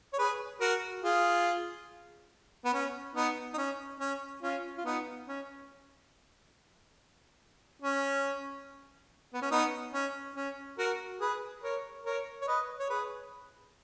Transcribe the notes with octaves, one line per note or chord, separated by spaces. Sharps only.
C#5
G#4 B4
F#4 A#4
F4 G#4
B3
C#4
B3 D#4
D#4
C#4
C#4
C#4 F4
F4
B3 D#4
C#4
C#4
B3
C#4
B3 D#4
C#4
C#4
F#4 A#4
G#4 B4
A#4 C#5
A#4 C#5
C#5
B4 D#5
C#5
G#4 B4